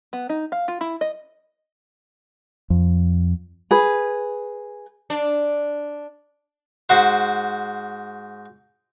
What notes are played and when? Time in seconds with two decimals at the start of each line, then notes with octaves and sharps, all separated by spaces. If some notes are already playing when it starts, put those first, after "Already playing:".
0.13 B3
0.29 D#4
0.52 F5
0.68 F4
0.81 E4
1.01 D#5
2.70 F2
3.71 G#4 B4
5.10 D4
6.89 G#2 F#4 C5